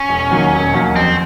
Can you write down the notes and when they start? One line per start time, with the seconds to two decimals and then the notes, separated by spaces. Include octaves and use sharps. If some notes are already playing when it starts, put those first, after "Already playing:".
Already playing: C#4
0.09 E1
0.30 D#2 D#3 F#3 A#3
0.53 E1
0.73 D#2 D#3 F#3 A#3
0.96 F2 C4